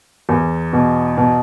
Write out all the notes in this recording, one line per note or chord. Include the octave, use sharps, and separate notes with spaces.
E2
B2
B2